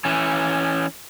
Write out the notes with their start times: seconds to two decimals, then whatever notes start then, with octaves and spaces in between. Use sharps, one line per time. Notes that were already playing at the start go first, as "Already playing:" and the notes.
0.05 E3 C#4